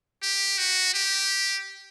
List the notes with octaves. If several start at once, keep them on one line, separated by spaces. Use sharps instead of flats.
G4
F#4
G4